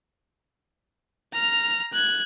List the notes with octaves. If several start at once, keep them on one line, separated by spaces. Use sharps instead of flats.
A#5 F6
F#6 G#6